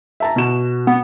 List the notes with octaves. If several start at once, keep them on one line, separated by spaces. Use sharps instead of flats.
E5 A5 A#5
B2 F#4 E7
B3